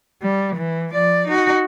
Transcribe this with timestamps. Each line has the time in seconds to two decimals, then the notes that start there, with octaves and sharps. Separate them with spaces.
0.22 G3
0.56 E3
0.93 F3 D5
1.28 D#4 F#4